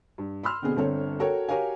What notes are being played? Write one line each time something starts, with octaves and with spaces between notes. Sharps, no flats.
G2
B5 C6 E6 F6
B2 D3 B3 C4 G#4
G1 D3 C4 A4 C#5
F#4 A4 A#4 C#5 G5
F#4 G4 A#4 C#5 F5 G#5